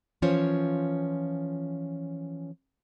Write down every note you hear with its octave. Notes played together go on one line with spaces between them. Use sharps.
E3 F3 C#4 F4 C5 C#5